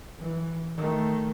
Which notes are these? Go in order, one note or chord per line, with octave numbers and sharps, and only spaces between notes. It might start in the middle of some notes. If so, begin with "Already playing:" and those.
E3
D#3 A3